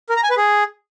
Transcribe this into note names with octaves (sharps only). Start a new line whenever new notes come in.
A#4
A#5
G#5
B4
G#4